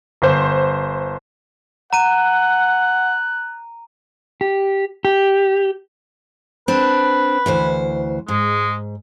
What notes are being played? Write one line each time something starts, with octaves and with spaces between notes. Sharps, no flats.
G1 C5
F#5 A#5 F#6 D#7
G4
G4
C4 D4 B4
D2 E3 C5
G#2 G#3